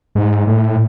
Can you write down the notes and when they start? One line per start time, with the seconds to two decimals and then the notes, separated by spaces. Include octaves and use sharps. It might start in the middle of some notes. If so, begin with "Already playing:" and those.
0.15 G#2
0.47 A2